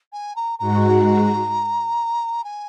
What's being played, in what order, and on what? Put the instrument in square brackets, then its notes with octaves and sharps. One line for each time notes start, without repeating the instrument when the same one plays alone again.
[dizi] G#5
A#5
[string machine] G#2 G#3 F#4 [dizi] A#5
[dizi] G#5